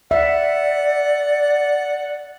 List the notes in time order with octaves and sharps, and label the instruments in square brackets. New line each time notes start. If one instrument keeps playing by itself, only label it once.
[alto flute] D5 [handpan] E5 [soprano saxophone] F#5